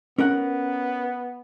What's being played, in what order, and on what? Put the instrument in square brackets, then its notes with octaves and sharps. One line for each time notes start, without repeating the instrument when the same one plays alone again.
[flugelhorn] B3 [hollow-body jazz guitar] C#4 A#4 F#5